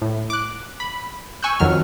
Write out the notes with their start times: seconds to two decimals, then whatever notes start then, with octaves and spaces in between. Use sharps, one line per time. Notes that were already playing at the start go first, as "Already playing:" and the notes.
0.02 A2
0.30 D6 F#6
0.80 B5
1.43 G#5 C#6 E6 F#6 G6
1.60 F2 D#3 F#3 F6